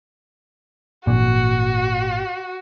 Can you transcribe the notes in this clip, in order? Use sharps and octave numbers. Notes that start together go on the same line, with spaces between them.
G#1 A#2 F#4